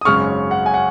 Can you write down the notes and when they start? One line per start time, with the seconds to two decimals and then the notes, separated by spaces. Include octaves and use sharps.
0.01 D#6
0.05 G#1 F#2 C#3 G#3 C#6 F6
0.51 F#5
0.66 G#5
0.74 F#5